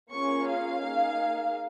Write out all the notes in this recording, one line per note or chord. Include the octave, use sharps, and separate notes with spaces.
A#3 C#4 F4 G#4 C#6
F5
A#3 D#4 G#4